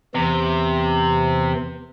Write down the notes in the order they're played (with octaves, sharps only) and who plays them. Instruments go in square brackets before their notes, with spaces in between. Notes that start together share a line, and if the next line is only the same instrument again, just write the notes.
[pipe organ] E2 E3 [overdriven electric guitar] C3